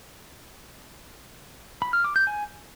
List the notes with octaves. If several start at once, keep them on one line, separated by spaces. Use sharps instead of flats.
B5
F6
D6
G6
G#5